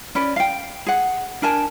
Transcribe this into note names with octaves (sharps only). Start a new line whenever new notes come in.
C#4 B4 D5
F5 G5
G#4 F#5
D4 A#4 G#5 A5